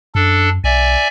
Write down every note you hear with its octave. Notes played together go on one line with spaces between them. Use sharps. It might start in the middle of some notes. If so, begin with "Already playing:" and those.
F#2 D4 A4
B1 D5 E5 G#5